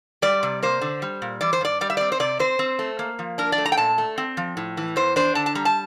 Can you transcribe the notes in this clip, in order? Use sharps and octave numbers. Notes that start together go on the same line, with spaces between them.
G3 D5
C3
A#3 C5
D3
G3
A#2
E3 D5
C5
G2 D5
G3 D5
E5
C4 D5
C5
C3 D5
C4 C5
C4
A3
A#3
F3
D4 A#4
D5
A3
A#5
G5
A#2 A5
A3
C4
F3
A2
E3
E2 C5
D4 C5
D3 A5
A5
G3 A#5
A5